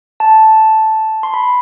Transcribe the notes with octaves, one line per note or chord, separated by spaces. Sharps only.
A5
C6
B5